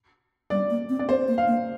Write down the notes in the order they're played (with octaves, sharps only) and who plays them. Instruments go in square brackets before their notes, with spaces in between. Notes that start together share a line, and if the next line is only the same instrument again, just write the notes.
[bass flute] G3 [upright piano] D5
[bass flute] A#3
C4
[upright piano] D5
[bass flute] C4 [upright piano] C5
[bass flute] A#3
[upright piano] F5
[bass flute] A#3